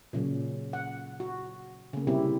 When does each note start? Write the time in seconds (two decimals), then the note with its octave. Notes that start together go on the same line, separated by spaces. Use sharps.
0.13 A#2 C#3 F#3
0.73 F#5
1.20 F#4
1.93 C#3 A#3
2.07 C3 G3 C4 E4 G4